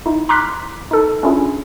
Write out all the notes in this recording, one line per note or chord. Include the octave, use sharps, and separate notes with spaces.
D#4 E4
A#5 C6 D6 F6 F#6 B6
D#4 A4
C#4 D4 E4 F4 G#4